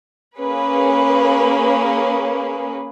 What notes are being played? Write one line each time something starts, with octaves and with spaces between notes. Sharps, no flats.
A#3 C#4 G#4 B4